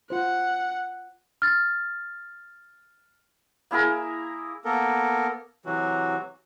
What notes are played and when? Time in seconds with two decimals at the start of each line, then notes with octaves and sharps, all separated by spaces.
0.10 F4 C5 F#5
1.42 F6 A6
3.71 A#3 E4 G#4 A#4
4.65 A#3 B3 A4 A#4
5.66 C3 E3 F#3 F#4